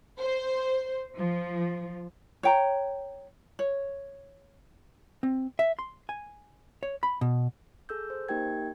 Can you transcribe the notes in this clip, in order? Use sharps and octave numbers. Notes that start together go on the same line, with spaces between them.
C5
F3
C#5 G5 A#5
C#5
C4
E5
C6
G#5
C#5
B5
B2
G#4 A4 E6 G6
C5
A#3 D#4 G4 A#4 G5 G#6